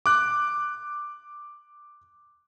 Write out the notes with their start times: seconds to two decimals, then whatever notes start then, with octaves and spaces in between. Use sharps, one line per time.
0.06 D6 F#6